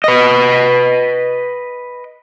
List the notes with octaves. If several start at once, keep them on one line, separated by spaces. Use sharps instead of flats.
B4 D#5